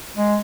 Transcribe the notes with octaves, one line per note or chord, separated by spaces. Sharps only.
G#3